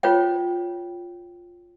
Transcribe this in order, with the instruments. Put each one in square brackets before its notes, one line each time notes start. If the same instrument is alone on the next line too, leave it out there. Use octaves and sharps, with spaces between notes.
[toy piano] F4 B4 C#5 G5